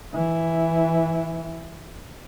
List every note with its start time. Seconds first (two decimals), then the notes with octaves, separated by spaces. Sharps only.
0.14 E3 E4